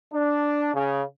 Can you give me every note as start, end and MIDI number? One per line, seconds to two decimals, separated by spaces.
0.12 0.70 62
0.74 1.02 49